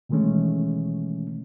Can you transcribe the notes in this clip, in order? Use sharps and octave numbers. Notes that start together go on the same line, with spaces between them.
B2 D#3 E3 G#3 A3 C#4